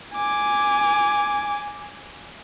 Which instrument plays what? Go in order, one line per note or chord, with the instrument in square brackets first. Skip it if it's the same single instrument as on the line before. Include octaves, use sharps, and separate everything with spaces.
[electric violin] G#5 D6